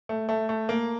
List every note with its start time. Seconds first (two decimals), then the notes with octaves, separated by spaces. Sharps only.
0.09 A3
0.29 A3
0.49 A3
0.69 A#3